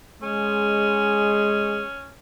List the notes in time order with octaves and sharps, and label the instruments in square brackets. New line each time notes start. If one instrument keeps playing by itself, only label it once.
[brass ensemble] G#3 G#4 [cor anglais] C#4